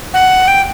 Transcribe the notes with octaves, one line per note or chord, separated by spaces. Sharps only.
F#5
G5